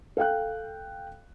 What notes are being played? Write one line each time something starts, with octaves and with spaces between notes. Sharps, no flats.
A4 F5 G5 F#6